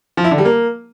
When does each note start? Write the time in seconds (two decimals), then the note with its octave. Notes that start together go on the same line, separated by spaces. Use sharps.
0.17 F3
0.24 E4
0.31 D3
0.38 G3
0.45 A#3